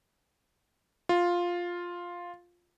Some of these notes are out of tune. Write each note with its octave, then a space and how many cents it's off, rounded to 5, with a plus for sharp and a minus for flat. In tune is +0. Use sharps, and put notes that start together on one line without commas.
F4 +5